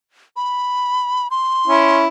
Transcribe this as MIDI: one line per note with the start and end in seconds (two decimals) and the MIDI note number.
0.36 1.28 83
1.31 1.97 84
1.67 2.07 61
1.67 2.07 64